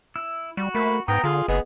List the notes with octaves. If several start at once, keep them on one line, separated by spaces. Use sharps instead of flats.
E4 E6
G3 F#4
A3 A#3 B5
G#2 B3 G5 A#5 D#6
D3 F4 G#4
F#1 B3 G#4 D#5